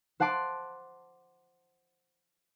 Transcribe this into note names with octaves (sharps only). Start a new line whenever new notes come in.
C5 F#5 A5 C6 D6